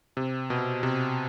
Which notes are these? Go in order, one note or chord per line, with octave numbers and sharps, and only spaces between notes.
C3
B2
C3